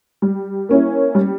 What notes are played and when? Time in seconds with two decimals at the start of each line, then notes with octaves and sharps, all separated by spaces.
0.22 G3
0.69 A#3 C#4 E4
1.15 G3